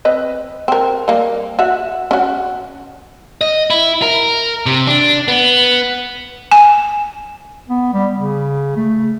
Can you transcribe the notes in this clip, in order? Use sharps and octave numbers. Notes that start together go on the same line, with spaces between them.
C4 B4 D#5
C4 A#4
G3 A#3
F#4 E5
C#4 F#4
D#5
E4
A#4
C3
D4
B3
G#5
B3
G3
C#3
A3